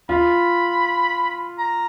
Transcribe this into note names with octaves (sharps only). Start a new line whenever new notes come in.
F4 B5
A#5